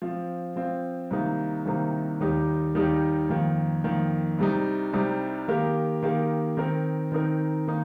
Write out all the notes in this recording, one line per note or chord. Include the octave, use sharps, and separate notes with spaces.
F3 C4 F4
F3 C4 F4
C2 C3 D#3 A#3 D#4
C2 C3 D#3 A#3 D#4
D#2 D#3 G3 D#4 G4
D#2 D#3 G3 D#4 G4
F2 D#3 A#3
F2 D#3 A#3
C2 C3 G3 D#4
C2 C3 G3 D#4
D#3 A#3 G4 A#4
D#3 A#3 G4 A#4
D#3 C4 D#4 A#4
D#3 C4 D#4 A#4
D#3 A#3 D#4